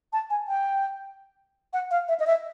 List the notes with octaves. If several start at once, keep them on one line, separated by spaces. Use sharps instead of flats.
A5
G#5
G5
F#5
F5
E5
D#5
E5